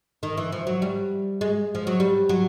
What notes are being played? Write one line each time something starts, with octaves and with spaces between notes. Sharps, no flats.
D#3
E3
F3
F#3
G3
G#3
F3
F#3
G3
F#3